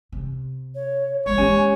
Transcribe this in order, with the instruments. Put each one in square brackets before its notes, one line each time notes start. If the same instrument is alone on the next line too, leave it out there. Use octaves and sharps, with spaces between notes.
[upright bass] C3
[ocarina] C#5
[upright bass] D#3 G#3 [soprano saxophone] C#5
[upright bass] D#2 G#3 [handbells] C#4 G#5 [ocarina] G4